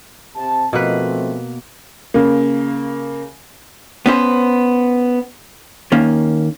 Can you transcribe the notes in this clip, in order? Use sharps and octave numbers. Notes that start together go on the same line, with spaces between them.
C3 A5
B2 F3 A3 A#3 C4 B4
C#3 A#3
B3 C#4 C5
D#3 A#3 C#4